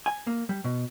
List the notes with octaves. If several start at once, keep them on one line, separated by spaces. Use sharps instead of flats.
G#5
A#3
G3
B2